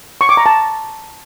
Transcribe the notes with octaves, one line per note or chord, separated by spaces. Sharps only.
C#6
D6
A#5
A5